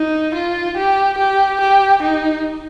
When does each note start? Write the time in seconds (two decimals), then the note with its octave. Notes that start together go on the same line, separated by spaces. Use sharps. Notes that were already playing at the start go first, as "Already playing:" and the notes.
Already playing: D#4
0.35 F4
0.77 G4
1.18 G4
1.61 G4
2.02 D#4